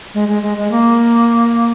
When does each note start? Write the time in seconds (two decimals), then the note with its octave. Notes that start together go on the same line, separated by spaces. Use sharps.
0.14 G#3
0.28 G#3
0.43 G#3
0.57 G#3
0.71 A#3